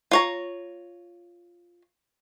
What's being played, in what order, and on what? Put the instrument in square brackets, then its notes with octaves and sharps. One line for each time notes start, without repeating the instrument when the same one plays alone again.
[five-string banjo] F4 C#5 A#5